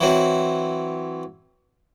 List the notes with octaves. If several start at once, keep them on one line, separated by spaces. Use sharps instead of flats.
E3 F#3 C4